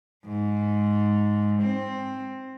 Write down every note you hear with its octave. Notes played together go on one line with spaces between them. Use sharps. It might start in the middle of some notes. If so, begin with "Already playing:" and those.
G#2
C4